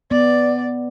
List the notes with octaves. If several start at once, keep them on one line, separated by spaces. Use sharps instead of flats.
B3 D5